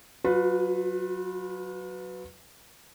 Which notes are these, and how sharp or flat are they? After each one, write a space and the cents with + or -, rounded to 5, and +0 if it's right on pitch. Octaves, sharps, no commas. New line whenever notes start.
F#3 +0 F4 +40 B4 +10